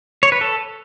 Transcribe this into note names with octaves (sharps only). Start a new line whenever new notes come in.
C#5
B4
A4